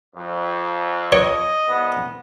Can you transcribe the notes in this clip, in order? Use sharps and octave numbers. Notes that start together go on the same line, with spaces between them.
F2
C#5 D#5
C2 B3